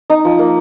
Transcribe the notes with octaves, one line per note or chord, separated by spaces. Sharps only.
D#4
F3
A#3